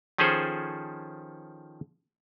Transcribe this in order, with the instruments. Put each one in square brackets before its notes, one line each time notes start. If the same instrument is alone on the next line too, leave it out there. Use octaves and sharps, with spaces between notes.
[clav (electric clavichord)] D#3 F3 C#4 G#4 A4 C5